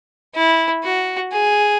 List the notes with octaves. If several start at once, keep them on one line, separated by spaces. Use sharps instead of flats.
E4
F#4
G#4